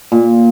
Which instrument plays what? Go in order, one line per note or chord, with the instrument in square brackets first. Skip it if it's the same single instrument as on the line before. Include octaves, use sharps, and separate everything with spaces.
[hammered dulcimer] A#2